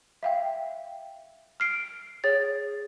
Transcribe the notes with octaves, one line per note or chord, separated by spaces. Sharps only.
E5 F5 G5
F6 C7 D7
G#4 C#5 A6